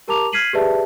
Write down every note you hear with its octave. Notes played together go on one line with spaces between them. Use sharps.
G4 A#4 A5 A#5 D6 F7
F6 G#6 B6 C7 D#7 F#7
G4 G#4 B4 D5 E5 A5